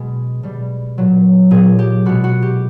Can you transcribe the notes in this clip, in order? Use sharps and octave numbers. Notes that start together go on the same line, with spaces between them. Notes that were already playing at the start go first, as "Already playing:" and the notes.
Already playing: B2 G#3 G#4
B2 G3
A#2 F#3
A#2 F#3 G#4
G4
B2 G#3 F#4
F#4
G4